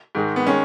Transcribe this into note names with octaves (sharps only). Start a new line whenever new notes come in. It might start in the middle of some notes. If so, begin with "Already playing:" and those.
G#2 D#3 G#3
B3
D#3 G#3 C#4